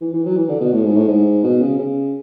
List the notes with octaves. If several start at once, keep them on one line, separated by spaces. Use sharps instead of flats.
E3
E3
F#3
E3
D3
B2
A2
G#2
A2
G#2
B2
C#3
C#3